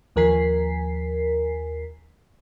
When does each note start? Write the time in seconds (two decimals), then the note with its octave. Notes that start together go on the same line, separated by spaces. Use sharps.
0.16 D#2 F3 A#4 G#5 B6 C7